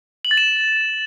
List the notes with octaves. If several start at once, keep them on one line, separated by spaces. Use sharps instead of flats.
F#7
A6
E7